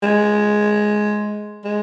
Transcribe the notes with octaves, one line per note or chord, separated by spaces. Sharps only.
G#3
G#3